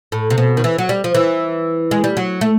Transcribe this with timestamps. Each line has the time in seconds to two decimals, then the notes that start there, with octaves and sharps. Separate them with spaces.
0.12 A2
0.30 C3
0.38 B2
0.57 D#3
0.64 E3
0.78 F#3
0.89 G3
1.04 F3
1.15 E3
1.91 G#3
2.04 G3
2.17 F#3
2.41 A3